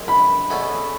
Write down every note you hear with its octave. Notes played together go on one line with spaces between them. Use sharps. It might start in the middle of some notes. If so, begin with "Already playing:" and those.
Already playing: F#2 D#3 G#3
B5
E2 B2 A3 C#4 F#4